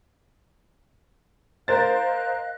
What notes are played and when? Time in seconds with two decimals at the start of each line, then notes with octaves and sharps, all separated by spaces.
1.68 A#4 C5 D#5 F5 F#6 A6